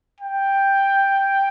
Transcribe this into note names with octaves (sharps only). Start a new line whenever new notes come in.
G5